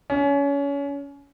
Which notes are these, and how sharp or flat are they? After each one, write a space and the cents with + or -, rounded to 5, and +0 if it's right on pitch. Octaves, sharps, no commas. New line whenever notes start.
C#4 +30